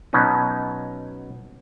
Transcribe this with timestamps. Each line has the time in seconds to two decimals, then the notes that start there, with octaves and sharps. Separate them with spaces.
0.13 B2 F#3 B3 C#4 D#4